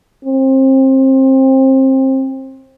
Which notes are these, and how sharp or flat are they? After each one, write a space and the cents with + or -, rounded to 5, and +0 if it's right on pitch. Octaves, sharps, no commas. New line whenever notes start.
C4 +25